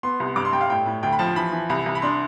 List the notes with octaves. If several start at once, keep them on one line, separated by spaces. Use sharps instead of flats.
B3 C6
C2
G2 D6
C6
G2 G5
F5
A2 G5
A2
D2 G5
B5
F3 A5
E3 B5
E3
C2 B5
C2
B5
D4 C6